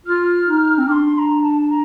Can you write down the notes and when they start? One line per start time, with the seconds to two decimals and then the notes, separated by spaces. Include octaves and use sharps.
0.06 F4 F6
0.47 D#4
0.78 C4
0.88 D4 D6
0.92 C6
1.15 C6
1.19 A#5
1.42 A5
1.62 A5
1.70 A#5